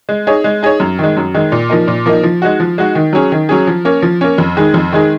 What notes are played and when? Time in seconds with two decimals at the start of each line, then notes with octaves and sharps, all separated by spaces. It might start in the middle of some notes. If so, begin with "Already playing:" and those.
0.09 G#3
0.27 D#4 G#4 C#5
0.44 G#3
0.63 D#4 G#4 C#5
0.80 F#2
0.99 D#3 G#3
1.17 F#2
1.34 D#3 G#3
1.52 A#2
1.70 F3 A#3 D#4
1.88 A#2
2.06 F3 A#3 D#4
2.23 F3
2.42 G#3 D#4 F#4
2.60 F3
2.78 G#3 D#4 F#4
2.95 D#3
3.13 F#3 C#4 G#4
3.32 D#3
3.49 F#3 C#4 G#4
3.67 F3
3.85 A#3 C#4
4.02 F3
4.21 A#3 C#4
4.38 F2
4.57 D#3 G#3 D#4 G#4
4.74 F2
4.92 D#3 G#3 D#4 G#4